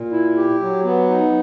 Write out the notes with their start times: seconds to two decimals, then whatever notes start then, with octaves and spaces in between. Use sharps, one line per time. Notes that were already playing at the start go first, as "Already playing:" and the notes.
Already playing: A#2
0.12 E4
0.37 G4
0.61 F#3
0.85 B3
1.10 D#4